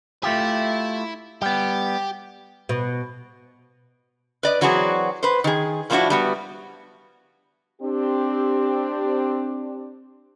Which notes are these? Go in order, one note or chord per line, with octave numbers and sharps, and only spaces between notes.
A3 E4 F4 G4 E5
G3 B3 G4
B2
B4 D5 D#5
E3 F#3 C4 F#4 G#4 D5
B4 C5
D#3 G#4
A2 F3 C4 D4 E4 F#4
G3 B3 F#4
C4 D4 G4